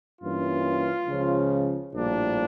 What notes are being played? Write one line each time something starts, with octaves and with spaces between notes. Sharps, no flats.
G2 E3 A#3 C#4 F4
C#2 C#3 F3 C#4
A#1 A2 G3 A#3 D4